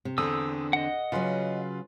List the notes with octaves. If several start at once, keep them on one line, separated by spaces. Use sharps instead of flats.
C3
E2 D3 C4 A4 D#6 E6
D#5 F#5
C#3 F#3 F4 B4 C6